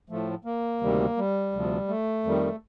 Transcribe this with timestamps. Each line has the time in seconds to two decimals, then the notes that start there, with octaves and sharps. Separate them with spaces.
0.10 A2 F3 A3
0.45 A#3
0.81 D2 C3 D#3 G3
1.17 G3
1.53 D2 C3 F3
1.88 A3
2.24 F2 D#3 G3